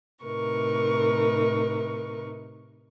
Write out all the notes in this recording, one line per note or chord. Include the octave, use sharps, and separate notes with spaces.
A2 C3 D#4 A#4 B4 C#6